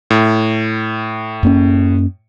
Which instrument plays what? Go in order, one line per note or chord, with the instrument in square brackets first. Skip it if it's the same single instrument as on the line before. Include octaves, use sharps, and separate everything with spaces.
[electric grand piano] A2
[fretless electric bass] F#2 A#3 C#4